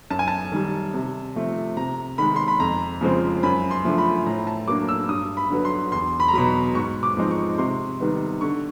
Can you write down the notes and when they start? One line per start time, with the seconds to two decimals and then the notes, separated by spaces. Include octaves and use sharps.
0.10 F#2 A5
0.19 G#5
0.28 A5
0.52 D#3 G3
0.94 C3
1.36 F3 A3 C4
1.77 C3 A#5
2.18 D#3 G#3 B5
2.36 C6
2.48 B5
2.60 F2 A#5
3.01 C#3 F3 G#3 C4
3.43 F#2 B5
3.71 C6
3.85 C#3 F3 A3 D4
3.98 B5
4.26 A2 A#5
4.47 A5
4.67 F#3 A#3 D4 D6
4.89 E6
5.08 G2 D#6
5.37 B5
5.50 D3 F#3 B3
5.65 C6
5.92 E2 C6
6.20 B5
6.28 A#5
6.33 B2 F#3 B5
6.75 G#2 C#6
7.03 D6
7.17 F3 G#3 C4 D#4
7.31 C#6
7.58 C3 C6
8.00 D#3 G3 B3 D#4
8.41 D3 C#6